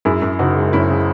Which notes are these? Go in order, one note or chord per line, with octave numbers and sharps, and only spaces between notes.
F#2 E4 G#4
F#2
F#1 D#4 F#4
G#3
F#2 C#4 E4
C#3